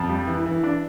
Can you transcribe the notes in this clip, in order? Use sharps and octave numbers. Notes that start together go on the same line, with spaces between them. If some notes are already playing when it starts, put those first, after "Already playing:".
Already playing: F2 A5
G3
E3
E3
D4